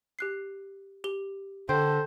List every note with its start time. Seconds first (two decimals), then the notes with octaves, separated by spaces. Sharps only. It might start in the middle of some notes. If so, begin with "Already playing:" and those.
0.19 G4 F#6 C7
1.04 G4 G7
1.69 D3 A4 C5 G5